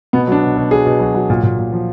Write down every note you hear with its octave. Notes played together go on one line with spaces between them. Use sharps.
B2 B3
F#3 D4
B2
B2
F#3 G#4
B2
F#3
F#3
A#2
A#2
A#2
F3